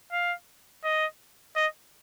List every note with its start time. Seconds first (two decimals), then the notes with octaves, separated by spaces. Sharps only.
0.12 F5
0.84 D#5
1.56 D#5